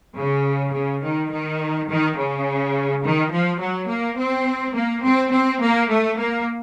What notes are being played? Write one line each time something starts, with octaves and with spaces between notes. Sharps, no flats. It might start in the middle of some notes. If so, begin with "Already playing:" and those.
C#3
C#3
D#3
D#3
D#3
C#3
D#3
F3
F#3
A#3
C4
A#3
C4
C4
A#3
A3
A#3